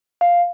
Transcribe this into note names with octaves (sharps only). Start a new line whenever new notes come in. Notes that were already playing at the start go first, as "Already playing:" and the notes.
F5